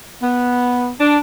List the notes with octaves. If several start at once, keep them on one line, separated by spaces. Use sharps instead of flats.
B3
D4